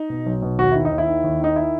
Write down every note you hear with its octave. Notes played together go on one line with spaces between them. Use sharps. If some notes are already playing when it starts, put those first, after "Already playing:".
Already playing: D#4
B2
B1
B2
D#2 F#4
D#3 E4
D#4
D#2
E4
D#3
D#2
D#3 D#4
E4